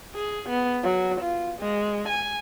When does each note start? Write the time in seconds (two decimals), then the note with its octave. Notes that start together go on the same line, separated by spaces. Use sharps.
0.15 G#4
0.49 B3
0.83 F#3
1.21 F4
1.60 G#3
2.09 G#5